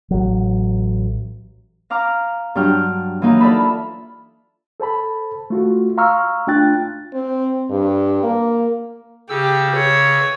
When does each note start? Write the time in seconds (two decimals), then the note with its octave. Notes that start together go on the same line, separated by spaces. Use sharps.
0.11 A1 F#3
1.90 F5 A#5 D6 F6
2.55 G2 F#3 D4 C#5 G5 F6
3.22 E3 F#3 A#3 D#4
3.40 F4 A4 D5 E5 A5 B5
4.80 A4 C5 A5 B5
5.50 A3 F4 F#4
5.98 F5 A#5 C6 C#6 E6 F6
6.47 A3 D4 F4 G5 F#6 A6
7.14 C4
7.70 G2
8.23 A#3
9.30 C#3 G4 E6
9.75 C#5